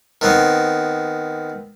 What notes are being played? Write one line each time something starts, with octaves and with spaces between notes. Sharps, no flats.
D#3 B3 C4